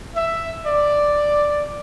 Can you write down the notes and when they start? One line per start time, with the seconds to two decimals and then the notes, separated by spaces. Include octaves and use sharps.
0.16 E5
0.66 D5